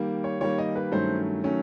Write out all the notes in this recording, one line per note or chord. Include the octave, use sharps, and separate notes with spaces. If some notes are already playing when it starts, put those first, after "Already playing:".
Already playing: D#3 G3 A#3
C#5
D#3 G3 A#3 C#5
D#5
B4
G2 D#3 F#3 A3 C#4 C5
D#3 F#3 A3 C#4